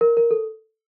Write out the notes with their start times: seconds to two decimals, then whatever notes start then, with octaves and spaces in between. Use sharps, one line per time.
0.01 A#4
0.17 A#4
0.31 A4